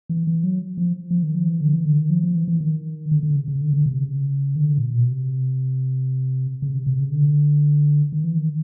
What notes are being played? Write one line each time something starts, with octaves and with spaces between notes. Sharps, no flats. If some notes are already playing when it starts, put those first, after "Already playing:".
E3
E3
F#3
F3
F3
D#3
F3
E3
D3
E3
D3
D#3
F3
F3
E3
E3
D#3
D3
D3
C#3
C#3
D3
D3
C3
C#3
D#3
D3
A#2
B2
C3
C#3
C3
C3
C#3
D3
D#3
E3
D#3